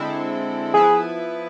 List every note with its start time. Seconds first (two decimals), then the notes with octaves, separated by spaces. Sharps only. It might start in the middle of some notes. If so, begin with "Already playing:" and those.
Already playing: D3 G#3 C4 E4 A4
0.74 F3 B3 E4 G#4 B4